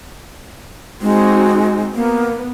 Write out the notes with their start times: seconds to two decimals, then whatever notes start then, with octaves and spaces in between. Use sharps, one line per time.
1.02 G#3 C4 D#4 F#4
1.95 A#3 B3